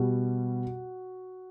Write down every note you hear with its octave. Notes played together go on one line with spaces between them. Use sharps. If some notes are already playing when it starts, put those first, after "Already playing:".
Already playing: B2 G3 F#4